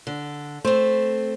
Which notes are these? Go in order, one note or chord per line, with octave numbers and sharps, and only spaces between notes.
D3
A3 C4 C5